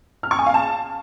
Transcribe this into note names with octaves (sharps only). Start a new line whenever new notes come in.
F6
C#6
G#5
F5
A5